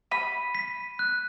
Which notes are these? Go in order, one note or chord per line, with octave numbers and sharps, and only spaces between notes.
B5 D#7
B6
F#6